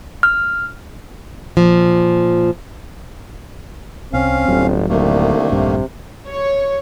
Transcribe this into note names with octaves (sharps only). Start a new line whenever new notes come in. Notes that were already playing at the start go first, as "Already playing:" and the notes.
F6
A#2 F3
C2 C3 C4 C#4 F5
D1 G1 D2 F#3
C2 D3 D#3 A3 A#3
A#1 G2 C3
C#5